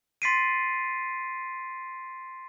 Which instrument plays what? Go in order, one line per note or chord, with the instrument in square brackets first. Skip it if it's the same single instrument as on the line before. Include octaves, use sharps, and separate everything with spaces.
[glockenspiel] C6 A6 B6 C7 D7 D#7